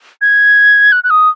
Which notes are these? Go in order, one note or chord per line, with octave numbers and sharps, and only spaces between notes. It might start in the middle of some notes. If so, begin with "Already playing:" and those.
G#6
F#6
F#6
D#6